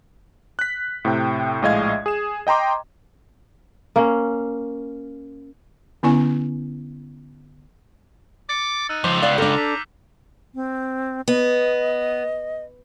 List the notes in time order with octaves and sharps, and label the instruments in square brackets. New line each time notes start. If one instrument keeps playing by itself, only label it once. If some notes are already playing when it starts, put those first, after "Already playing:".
[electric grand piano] F#6 B6
A2 C3 G5
A#1 A2 G#3 D#5 F5 G#6
G#4 E7
D#5 G5 A#5 C6 D6
[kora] A#3 C#4
[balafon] D3 B3 C#4 E4 G#5
[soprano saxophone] D6 [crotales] A6 C#7
[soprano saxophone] D#4 [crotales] E6 F#6 D#7
[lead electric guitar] C#2 [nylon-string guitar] F3 [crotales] D6 G6 C7
[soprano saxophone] B3 [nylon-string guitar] D5 F5
[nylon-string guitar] D4 A4 [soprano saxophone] A#5 [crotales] D6 F6 G6
[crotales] D6 E6 B6
[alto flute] C4
[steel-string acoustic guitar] B3 [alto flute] D#5